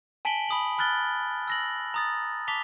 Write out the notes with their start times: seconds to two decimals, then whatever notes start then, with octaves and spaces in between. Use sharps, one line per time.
0.25 G#5 A5 B6 D7 F#7 G7
0.49 B5 D#6 F#7
0.78 B5 F6 F#6 A6 G7
1.48 E6 A#6 F#7
1.94 A#5 D#6 A6
2.48 A5 D6 B6 F7 G7